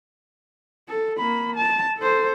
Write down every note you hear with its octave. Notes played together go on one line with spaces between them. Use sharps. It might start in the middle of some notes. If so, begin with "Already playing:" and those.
A4
A#3 B5
A5
A4 C5